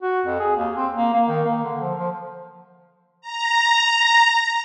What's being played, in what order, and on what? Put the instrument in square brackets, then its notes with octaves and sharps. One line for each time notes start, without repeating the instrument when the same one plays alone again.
[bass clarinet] F#4
F2
G#4
D#2
C4
A#3
A#3
D#3
A#3
D3
F3
F3
[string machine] A#5